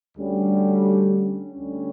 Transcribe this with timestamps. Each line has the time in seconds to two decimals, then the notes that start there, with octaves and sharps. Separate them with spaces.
0.17 D2 D3 G3 C#4
1.50 D2 D3 G3 C#4